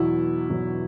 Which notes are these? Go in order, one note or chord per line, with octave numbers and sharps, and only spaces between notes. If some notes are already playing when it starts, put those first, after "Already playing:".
Already playing: E2 B2 F#3 E4
E2 B2 F#3